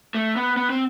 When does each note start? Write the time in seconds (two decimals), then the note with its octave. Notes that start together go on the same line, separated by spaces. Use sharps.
0.14 A3
0.36 B3
0.57 B3
0.70 C4